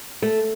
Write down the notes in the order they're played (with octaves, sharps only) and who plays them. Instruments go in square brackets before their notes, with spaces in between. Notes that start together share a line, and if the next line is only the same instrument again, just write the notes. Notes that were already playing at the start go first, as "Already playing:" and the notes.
[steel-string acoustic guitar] A3